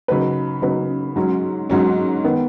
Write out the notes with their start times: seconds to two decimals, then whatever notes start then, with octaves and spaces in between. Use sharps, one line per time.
0.08 C#3 F#3 D#4 B4
0.62 C#3 F#3 D#4 B4
1.16 G#2 F#3 C#4
1.70 G#2 F#3 C#4
2.24 D#3 B3